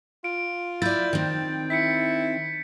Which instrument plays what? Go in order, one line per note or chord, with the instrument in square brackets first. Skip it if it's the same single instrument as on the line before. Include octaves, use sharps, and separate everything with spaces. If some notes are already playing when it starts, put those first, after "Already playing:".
[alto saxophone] F4 [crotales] D7
[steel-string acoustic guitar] E4 D5 [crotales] G6 A6
[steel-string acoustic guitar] D#3 C4
[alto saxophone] E4 [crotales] B6 C#7